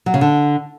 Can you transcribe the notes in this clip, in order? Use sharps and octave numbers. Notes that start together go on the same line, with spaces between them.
F#3
C#3
D3